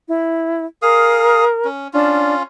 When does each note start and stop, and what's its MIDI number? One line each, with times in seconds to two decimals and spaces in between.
0.08 0.65 64
0.82 1.45 68
0.82 1.68 70
0.82 1.45 77
0.82 1.45 87
1.65 1.88 61
1.93 2.43 61
1.93 2.34 62
1.93 2.43 65